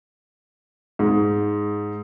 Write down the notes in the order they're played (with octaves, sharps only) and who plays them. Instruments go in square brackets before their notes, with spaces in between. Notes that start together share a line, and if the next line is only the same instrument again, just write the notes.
[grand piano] G#2